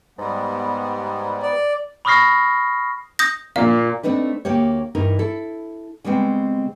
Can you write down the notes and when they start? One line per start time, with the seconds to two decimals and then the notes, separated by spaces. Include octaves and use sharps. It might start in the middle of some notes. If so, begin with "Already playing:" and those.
0.19 G#2 G3 B3
1.42 D5
2.05 B5 C#6 D#6 F6 A#6 C7
3.19 D#6 G6 A#6
3.56 A#2 A#3 F5
4.03 A3 C4 D4 D#4 B4
4.45 D2 A#3 G4 C#5
4.95 G2 E3 D#4 A#4
5.19 E4 A4
6.04 C#3 G3 G#3 B3 C4